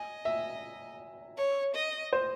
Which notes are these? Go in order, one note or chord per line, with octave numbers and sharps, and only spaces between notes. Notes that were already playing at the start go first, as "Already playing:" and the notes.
Already playing: D#5 G#5
E5
C#5
D#5
C5